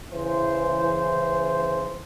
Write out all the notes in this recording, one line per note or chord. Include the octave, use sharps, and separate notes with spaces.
C#3 E3 C5